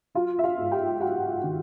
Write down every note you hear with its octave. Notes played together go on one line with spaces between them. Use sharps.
F#3 F4 F5
E5
F4 F5
G#2
G4 G5
F#3 F#4 F#5
D#3